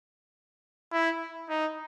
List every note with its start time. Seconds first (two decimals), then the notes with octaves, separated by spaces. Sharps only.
0.93 E4
1.49 D#4